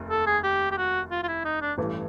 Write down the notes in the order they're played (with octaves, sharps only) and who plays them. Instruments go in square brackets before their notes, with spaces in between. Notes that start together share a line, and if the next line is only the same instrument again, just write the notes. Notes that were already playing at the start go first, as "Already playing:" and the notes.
Already playing: [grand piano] F1 D#2
[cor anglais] A4
G#4
G4
G4
F#4
F4
F4
E4
D#4
D4
[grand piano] A1 G2 E3 A3